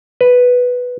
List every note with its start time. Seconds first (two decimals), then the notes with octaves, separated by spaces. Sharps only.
0.21 B4